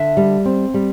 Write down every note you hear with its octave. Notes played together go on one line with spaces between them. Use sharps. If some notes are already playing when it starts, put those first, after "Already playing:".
Already playing: D3 E5
G3
C4
G3